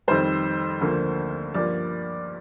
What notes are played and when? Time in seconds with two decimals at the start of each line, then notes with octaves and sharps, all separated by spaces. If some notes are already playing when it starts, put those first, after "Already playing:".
0.08 F2 D#3 G3 C5
0.81 D2 D3 F3 A#3
1.54 G2 F3 A#3 D5